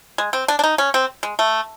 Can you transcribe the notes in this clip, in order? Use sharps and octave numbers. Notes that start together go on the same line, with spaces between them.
G#3
C4
D4
D4
D#4
C#4
C4
G#3
A3